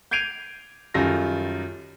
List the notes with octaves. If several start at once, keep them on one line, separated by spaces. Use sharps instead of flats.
G6 G#6 C7 D7 D#7 F7
F#2 D#3 G3 F4 A4 A#6